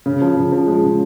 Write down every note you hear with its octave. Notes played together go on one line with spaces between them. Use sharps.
C#3
F3
C#3
F3
G#3
C#3